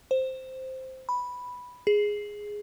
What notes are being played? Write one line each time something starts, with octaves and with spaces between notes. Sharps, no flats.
C5
B5
G#4